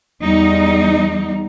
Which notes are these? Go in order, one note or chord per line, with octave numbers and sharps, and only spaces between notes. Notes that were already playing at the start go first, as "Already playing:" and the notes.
E2 G3 D#4